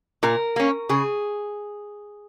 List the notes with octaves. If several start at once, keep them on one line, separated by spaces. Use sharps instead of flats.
A#2 A#4
A#3 C#4
C#3 G#4